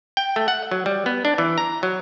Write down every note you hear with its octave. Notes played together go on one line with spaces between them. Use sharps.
G5
A3
F#5
F#3
G3
B3
D4
E3
A#5
F#3